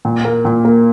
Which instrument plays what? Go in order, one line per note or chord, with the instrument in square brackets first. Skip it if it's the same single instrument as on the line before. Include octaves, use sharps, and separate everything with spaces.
[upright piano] A#2
A#3
A#2
A#3